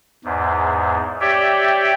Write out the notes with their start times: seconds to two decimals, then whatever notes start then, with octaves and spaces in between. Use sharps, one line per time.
0.24 E2 G#2
1.21 G4 C#5 D5 E5 G5